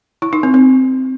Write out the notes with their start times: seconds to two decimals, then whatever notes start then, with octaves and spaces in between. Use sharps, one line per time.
0.22 E4
0.33 D#4
0.43 C4
0.54 C4